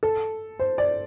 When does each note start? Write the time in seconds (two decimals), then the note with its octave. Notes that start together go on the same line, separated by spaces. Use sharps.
0.03 A4
0.59 C5
0.78 D5